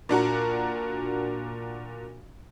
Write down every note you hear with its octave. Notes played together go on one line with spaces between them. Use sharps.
A#2 D4 F#4 A#4